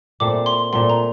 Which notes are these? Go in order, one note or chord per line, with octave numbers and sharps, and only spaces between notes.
A#2 A3 C4 D6
C6
A#2 A3 C4 C6
A#5